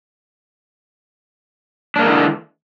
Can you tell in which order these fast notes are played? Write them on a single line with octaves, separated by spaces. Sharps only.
D4 A#3 G#3 E3 D3